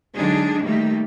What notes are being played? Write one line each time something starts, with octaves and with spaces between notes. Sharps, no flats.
D3 F#3 G#3 D4 D#4 G#4
D#3 G3 A3 A#3 G4